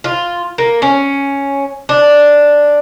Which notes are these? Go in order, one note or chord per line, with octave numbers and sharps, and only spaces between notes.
F4
A#3
C#4
D4